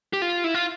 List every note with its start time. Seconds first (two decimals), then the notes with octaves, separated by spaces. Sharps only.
0.13 G4
0.22 F4
0.44 E4
0.54 F4